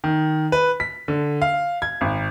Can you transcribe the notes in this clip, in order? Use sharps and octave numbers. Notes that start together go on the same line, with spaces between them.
D#3
B4
B6
D3
F5
G#6
G#1